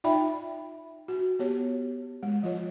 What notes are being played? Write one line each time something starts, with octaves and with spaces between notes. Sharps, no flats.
D#4 F4 D5 E5 G5 B5
F#4
B3 G4 C#5
G#3
F3 F4 C#5